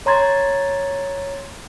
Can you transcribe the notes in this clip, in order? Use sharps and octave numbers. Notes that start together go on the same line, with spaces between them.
C#5 A#5 C6 G#6 A6